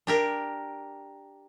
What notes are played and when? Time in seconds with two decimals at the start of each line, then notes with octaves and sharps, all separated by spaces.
0.07 D4 G4 A#4